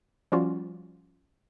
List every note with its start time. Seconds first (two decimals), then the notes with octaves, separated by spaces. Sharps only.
0.32 F3 G3 C#4 F4 F#4